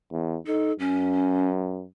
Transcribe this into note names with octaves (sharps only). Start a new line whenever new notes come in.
E2
D#4 A4
F#2 C#4